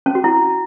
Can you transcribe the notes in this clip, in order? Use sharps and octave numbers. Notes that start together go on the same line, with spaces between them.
C#4
F#4
E4